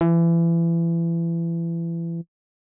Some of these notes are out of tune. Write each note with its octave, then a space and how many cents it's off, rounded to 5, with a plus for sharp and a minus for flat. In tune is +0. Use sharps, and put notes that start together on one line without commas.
E3 +30